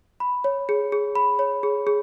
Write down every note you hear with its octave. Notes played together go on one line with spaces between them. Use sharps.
B5
C#5
G#4
G#4
B5
C#5
G#4
G#4